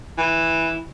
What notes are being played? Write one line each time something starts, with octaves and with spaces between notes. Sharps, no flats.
E3